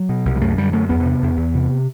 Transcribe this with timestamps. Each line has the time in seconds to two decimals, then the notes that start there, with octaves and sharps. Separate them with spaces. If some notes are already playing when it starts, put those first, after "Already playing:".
Already playing: F#3
0.09 B2
0.25 C2
0.36 G3
0.41 F#2 A3
0.57 D3 G3
0.73 F#2 A3
0.89 E2 B3
1.05 C3
1.22 E2
1.37 E2
1.55 C3